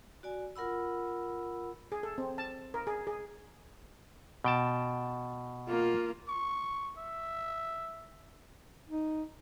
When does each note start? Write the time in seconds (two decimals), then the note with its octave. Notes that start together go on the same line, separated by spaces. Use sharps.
0.23 F#4 D5 G#5
0.56 F4 A#4 F#5 B5 E6
1.92 G#4
2.03 A4
2.18 C4
2.38 A5
2.74 A#4
2.87 G#4
3.07 G#4
4.44 B2 G5 A5
5.68 A#3 F4
6.28 C#6
6.98 E5
8.89 D#4